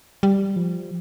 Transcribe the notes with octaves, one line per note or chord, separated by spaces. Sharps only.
G3
F3